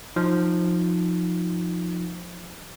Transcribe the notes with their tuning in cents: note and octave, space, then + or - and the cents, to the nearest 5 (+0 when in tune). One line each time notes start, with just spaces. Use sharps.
F3 +15 D#4 +0